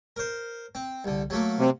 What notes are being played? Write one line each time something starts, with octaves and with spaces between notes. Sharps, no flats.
A#4 C5
C4
C2 D3
F#3 A3 A#3
C3